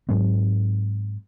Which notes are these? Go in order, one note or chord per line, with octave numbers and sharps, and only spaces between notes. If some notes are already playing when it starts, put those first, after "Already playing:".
G#2 F#3 G#3 C4